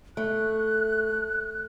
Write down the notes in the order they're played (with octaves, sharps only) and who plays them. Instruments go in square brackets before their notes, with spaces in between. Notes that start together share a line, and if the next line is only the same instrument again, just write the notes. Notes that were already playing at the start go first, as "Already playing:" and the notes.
[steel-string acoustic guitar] A3 [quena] F#6